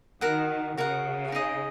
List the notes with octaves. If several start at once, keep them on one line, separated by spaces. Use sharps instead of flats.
D#3 F#4 A#4 F#5
C#3 F#4 A#4 F#5
D#4 G#4 D#5